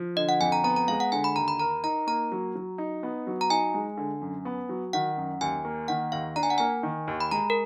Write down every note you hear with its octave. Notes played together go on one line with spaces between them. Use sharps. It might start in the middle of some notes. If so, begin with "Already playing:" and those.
Already playing: F3
D3 D#5
F#5
F2 G#5
A#5
B3 A#5
A#5
G#3 F5
F#5
D3 G#5
B5
D#2 A#5
B5
A#4 A#5
D#4 A#5
A#3 A#5
F#3
F#3
D#4
B3
F#3
A#5
D#4 G#5
G#3
D3
F#2
B3
F#3
D#3 F#5
F#2
D#2 G#5
A#3
D#3 F#5
D#2 F5
D4 A#5
G#5
F#5
A#3 G#5
D#3
D#2
B5
G#3 A#5
A#4